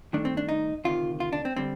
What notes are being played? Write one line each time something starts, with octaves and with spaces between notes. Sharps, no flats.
G2 D#3 A3 D4
C4
D4
D#4
D2 C3 D#3 F4
F4
D4
C4
D3 G3 C4